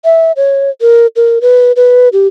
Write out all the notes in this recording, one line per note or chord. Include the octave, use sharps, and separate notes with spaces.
E5
C#5
A#4
A#4
B4
B4
G4